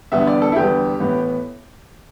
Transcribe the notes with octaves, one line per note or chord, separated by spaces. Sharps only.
E2 D3 G3 B3 E5
D5
A4
E4
E2 D3 G3 B3 G4
A2 E3 B3